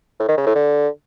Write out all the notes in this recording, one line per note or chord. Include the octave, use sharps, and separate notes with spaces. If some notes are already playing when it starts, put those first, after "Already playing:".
A2
D#3
C#3
A2
D3